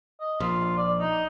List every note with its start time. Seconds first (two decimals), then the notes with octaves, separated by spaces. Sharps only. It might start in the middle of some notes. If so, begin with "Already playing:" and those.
0.21 D#5
0.40 A#1 F4
0.77 D5
1.00 D#4